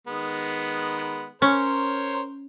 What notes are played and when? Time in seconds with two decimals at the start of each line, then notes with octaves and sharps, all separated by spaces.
0.07 D#3 G#3 B3
1.42 C#4 A#4 C5 C#5